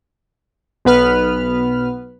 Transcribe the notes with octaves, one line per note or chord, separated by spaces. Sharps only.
B1 B3 B4 F6